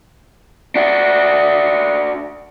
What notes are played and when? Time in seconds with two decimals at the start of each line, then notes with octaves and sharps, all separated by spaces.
0.75 D4 F#4